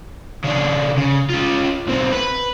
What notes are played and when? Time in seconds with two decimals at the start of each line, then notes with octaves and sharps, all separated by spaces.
0.44 C#3 D4
0.98 C#3
1.30 C#4 F4
1.87 B1 C4
2.13 B4